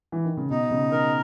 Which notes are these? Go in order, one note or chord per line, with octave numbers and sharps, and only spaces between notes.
E3
D#3
C#3
B2 D#4
C#3
D#3 A#4